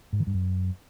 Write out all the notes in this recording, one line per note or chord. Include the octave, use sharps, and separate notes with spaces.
G#2
D#3
G2
F#2